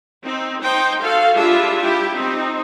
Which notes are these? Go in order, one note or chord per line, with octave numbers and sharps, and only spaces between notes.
C4 D#4
D#4 C5 G5
F#4 A4 F5
G3 D4 E4 F4 G#4 E5
E4 G4
C4 D#4